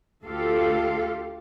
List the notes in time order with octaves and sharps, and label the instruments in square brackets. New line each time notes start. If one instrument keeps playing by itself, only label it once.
[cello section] D2 F4 G4 A4 F5